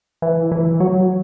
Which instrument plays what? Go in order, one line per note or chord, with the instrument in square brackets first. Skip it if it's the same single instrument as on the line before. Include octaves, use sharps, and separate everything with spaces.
[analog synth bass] E3
E3
F#3